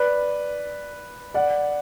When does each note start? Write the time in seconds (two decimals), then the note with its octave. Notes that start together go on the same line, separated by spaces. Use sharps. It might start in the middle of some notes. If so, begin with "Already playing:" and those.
Already playing: B4 D5
1.34 D5 F#5